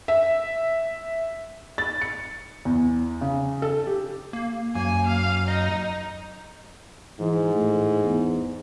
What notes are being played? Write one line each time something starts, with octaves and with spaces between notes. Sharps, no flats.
E5
A6
C#7
E2
C#3
A4
G4
A#3
F#2 A#3 G#5
F5
D#4 D#5
G#2 E3
A2
E2